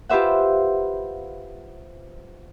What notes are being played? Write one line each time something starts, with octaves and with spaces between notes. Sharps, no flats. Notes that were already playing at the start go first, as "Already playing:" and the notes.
F4 G4 B4 C5 E5 F#5